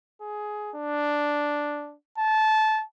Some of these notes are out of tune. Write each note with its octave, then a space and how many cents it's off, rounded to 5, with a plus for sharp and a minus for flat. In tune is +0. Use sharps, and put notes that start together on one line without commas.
G#4 +15
D4 +0
A5 -20